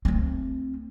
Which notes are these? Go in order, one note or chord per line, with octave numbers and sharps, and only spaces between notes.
A3 C4